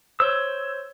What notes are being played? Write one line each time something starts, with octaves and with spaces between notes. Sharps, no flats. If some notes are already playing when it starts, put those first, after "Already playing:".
C5 C#5 E6